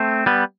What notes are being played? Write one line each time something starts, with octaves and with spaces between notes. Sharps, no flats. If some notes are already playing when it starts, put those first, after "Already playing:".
Already playing: A3 C4
G3 B3